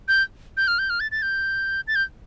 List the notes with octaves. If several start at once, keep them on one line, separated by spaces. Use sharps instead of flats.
G6
G6
F6
G6
F6
A6
A6
G6
A6
G6